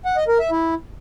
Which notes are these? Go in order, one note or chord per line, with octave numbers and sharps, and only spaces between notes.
F#5
D#5
A#4
E5
E4